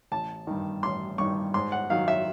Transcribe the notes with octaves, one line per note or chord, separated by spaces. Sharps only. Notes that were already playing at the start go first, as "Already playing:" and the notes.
A1 A5
G2 D#3
A1 C6
G2 D#3 C#6
G#2 C6
F#5
D#3 F#3 F5
E5